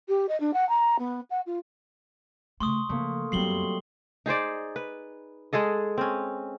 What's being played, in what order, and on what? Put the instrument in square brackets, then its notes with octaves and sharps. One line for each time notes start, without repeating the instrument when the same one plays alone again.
[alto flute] G4
D#5
D4
F#5
A#5
B3
F#5
F4
[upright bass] C#3 A3 [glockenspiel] C6 C#6 D#6
[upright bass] C#3 F3 [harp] A3 A#3
[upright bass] F#2 B3 [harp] F#3 G3 C4 [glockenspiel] C7 F#7 G7
[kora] D#4 G#4 C5 D5
B4
G#3 G#4 A4 D#5
C4 C#4